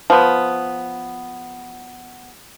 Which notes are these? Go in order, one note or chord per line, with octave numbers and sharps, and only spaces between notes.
F3 B3